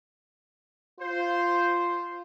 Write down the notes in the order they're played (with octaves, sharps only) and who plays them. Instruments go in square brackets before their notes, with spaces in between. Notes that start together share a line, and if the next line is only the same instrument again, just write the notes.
[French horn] F4 [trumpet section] C5